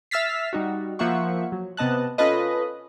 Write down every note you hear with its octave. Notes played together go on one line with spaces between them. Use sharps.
E5 E6 F6 A6 B6 C7
G3 D#4 F#4
F3 A#3 E5 F#5 C#6
F#3
C3 B3 D#5 A5 F#6
C#4 F4 A4 B4 D#5